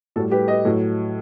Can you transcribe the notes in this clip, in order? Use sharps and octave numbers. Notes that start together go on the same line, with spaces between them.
A2 G3 F#4 A4
G4 B4
B4 D#5
A2 F#3